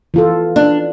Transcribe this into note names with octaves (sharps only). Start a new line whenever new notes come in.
E3 F4 A4
D4